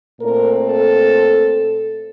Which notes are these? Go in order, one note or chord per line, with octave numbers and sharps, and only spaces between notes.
A#2 A3 C4 A#4
A4